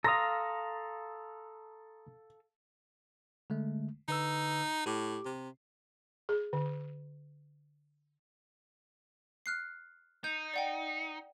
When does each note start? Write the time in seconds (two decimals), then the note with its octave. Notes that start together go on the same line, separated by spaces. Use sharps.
0.04 A4 F5 A#5 C6 D#6 A#6
3.50 D3 G#3 A3
4.08 D3 D#4 B4 E6
4.86 A2 G4 D6
5.25 C3
6.29 G#4
6.53 D3
9.46 F6 F#6 C7
10.24 D#4 G6
10.54 D5 F#5 G5